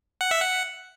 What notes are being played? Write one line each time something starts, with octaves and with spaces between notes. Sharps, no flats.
F#5
E5
F#5